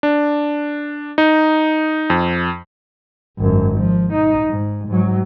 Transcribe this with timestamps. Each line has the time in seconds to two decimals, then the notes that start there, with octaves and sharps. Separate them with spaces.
0.03 D4
1.18 D#4
2.10 F2
3.38 G#1 F#2
3.79 F3
4.13 D#4
4.50 G#2
4.88 G#2 F#3